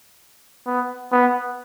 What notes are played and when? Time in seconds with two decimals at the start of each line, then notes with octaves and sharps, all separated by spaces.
0.67 B3
1.12 B3